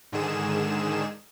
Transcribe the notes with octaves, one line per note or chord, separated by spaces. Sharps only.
G#2 D3 D#3 G#4 E7